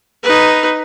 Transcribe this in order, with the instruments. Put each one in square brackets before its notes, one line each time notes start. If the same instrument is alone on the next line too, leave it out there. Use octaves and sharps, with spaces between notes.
[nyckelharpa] D#4 B4